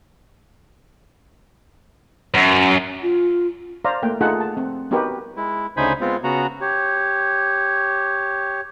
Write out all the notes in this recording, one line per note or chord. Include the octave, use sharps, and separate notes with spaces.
F#2
F4
C5 D5 F5 A#5
A3 A#3 G5
A3 D#4 F4 G#4 A4 F#5
A5
C4
B3 D#4 F#4 G4 A#4 B4
G#3 E4
D2 C#3 D#4 C5 G#5 B5
G#3 B3 C4 F4
C#3 B3 F#4 A#5
G4 C#5